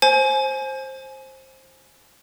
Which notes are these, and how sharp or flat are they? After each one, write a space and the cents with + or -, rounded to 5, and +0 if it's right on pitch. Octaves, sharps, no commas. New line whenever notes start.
C5 +15 G#5 +20